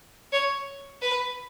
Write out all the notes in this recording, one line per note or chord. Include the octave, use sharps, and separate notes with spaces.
C#5
B4